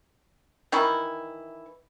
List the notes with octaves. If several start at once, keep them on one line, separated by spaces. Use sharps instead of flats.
D#3 E3 E4 C#6